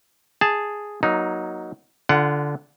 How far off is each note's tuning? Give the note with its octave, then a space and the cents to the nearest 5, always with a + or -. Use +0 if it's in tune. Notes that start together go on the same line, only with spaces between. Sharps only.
G#4 +0 A5 +0
F#3 +0 A#3 +30 D#4 +0
D3 -10 F4 -20 F#5 +15